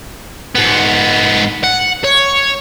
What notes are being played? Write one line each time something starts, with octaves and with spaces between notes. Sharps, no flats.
G#2 B3
F#5
C#5